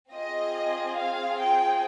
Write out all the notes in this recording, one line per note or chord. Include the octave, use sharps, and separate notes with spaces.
C4 F4 G#4 D#5
F5
G5